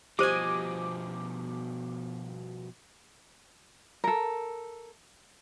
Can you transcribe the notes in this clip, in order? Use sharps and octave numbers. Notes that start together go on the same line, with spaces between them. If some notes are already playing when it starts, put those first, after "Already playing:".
B2 F3 G4 C5 D#5 G#5 D6 D#7
A4 A#4